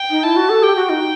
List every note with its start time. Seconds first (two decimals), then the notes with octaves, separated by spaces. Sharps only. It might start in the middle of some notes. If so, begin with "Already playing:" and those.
Already playing: G5
0.10 D#4
0.24 E4 A5
0.36 F#4
0.50 A4
0.63 G4 G5
0.76 F#4
0.90 D#4